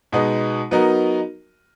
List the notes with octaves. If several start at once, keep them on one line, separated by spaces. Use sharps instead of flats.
B2 G#3 B3 D#4
F#3 B3 D#4 F#4 A#4